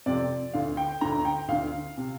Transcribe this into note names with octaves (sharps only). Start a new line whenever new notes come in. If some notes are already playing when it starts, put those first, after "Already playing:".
F2 C3 D5
D2 D3 F5
G5
D2 D3 A#5
G5
D2 D3 F5
C3